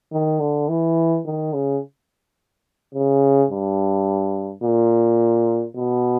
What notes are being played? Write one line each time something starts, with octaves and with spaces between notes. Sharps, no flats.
D#3
D3
E3
D#3
C#3
C#3
G2
A#2
B2